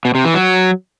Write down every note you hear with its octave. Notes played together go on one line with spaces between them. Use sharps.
B2
C3
E3
F#3